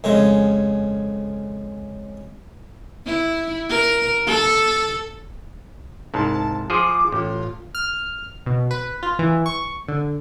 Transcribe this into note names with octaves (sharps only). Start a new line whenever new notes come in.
F2 C#3 G#3
E4
A#4
A4
C2 G#2 A5
F3 G#4 C5 D6
A1 F4
F6
B2
B4
F4
E3
C#6
D3